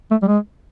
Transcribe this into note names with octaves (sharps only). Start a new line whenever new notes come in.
A3
G3
G#3